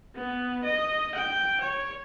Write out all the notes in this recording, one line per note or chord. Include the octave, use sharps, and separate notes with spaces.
B3
D#5
G5
C#5